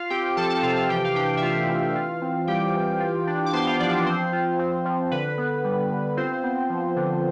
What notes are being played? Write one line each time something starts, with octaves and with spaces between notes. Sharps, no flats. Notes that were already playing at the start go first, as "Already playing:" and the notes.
Already playing: F4 F5
C4 G4 G5
F3 A4 A5
A4 A5
C3 F4 F5
F4 F5
E3 G4 G5
F5
D4 G4 G5
E5
A3 F4 F5
E3
F4
C4
G3 G4 G5
E3
F4
D4
D6
B3 C5 C6
F4 F5
F3 D4 D5
D4 D5
F3 C4 C5
F4
C4
F3
D3 B4
B3
G3
D3
C4 F4 C5
B3
F3
D3